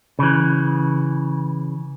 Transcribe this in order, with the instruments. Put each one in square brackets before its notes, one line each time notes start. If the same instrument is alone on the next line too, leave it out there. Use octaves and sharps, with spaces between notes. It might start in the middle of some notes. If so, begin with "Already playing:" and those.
[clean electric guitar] C#3 E3